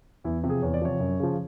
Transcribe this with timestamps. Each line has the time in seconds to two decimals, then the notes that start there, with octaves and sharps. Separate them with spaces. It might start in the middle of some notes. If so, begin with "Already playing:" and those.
0.24 E2 E4
0.44 C3 F3
0.50 G#4
0.62 E2 C#5
0.74 D5
0.82 C3 F3 C#5
1.00 F#2
1.20 C#3 F3